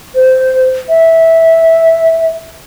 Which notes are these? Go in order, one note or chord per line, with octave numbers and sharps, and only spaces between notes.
C5
E5